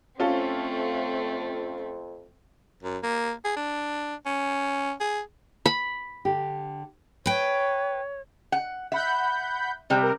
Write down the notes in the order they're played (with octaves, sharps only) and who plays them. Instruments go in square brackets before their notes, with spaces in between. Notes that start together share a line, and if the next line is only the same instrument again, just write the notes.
[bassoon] F2 [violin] A3 C4 [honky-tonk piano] C#4 F4 A4
[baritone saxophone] F#2
A#3
G#4
D4
C#4
G#4
[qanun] B5
[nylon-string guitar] D3 G4
[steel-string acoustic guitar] B4 G5 [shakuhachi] C#5
[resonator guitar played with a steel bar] F#5
[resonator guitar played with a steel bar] E5 [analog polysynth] F#5 B5 G6
[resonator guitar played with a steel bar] C3 G3 C4
[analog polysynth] A#4